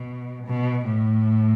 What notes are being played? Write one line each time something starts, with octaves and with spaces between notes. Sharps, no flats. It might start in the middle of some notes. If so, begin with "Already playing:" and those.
Already playing: B2
B2
A2